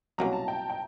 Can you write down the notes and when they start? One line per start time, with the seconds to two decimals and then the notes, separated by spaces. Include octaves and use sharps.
0.18 C2 B2 F#3 A#3 C#4 A#5
0.33 A5
0.48 G5
0.70 G5